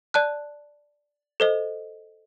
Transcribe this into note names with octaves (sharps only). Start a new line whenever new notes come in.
D5 A5 F#6
A4 C5 D#5